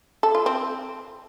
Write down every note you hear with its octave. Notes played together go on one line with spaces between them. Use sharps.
A4
F4
C4